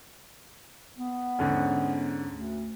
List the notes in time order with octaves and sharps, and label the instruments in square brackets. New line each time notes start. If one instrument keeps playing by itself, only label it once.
[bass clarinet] B3
[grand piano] G#2 D3 C#4
[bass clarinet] D2